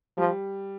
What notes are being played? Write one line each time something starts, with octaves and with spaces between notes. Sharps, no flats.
F3 G3